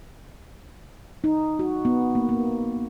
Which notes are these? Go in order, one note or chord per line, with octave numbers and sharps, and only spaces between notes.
D#4
F#4
B3
A#3
A#3